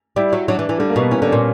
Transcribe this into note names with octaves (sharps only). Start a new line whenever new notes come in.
G3 E4
F#3
F#3 D4
E3
E3
D3 G3
A#3
B2 B3
E3 C#4
D3
A#2 C#4